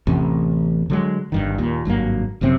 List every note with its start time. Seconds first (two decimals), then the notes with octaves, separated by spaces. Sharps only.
0.07 A1 E2 C3 C#4
0.90 D3 F#3 G#3
1.32 G1 G2 D#3
1.58 D#2 A#2
1.85 G#1 G2 F#3 A#3
2.41 F#1 F#2 C3 C4